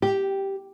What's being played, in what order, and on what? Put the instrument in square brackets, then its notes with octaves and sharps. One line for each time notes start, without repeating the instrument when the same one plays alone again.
[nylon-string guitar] G4